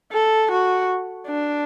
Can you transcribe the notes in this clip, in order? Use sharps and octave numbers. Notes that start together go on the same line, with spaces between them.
A4
F#4
D4